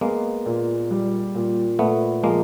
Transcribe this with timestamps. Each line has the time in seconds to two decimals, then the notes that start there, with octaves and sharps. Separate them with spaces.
0.01 G#3 A#3 B3
0.46 A#2
0.91 G3
1.35 A#2
1.79 A#2 A3 B3
2.23 F3 G#3 A#3